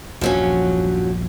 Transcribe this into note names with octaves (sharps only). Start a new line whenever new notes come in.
A#1 E2 G2 F3 F#3 C#4